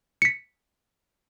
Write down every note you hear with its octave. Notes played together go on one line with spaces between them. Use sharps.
B6 C#7